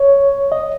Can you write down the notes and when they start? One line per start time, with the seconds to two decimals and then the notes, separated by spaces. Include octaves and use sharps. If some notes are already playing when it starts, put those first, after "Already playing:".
Already playing: C#5
0.52 D#5